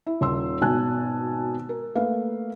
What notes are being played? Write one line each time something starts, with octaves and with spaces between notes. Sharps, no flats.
E4
D#1 C6 E6
G#1 B2 G#5 A5 F#6
A#4
A3 A#3 B4 F5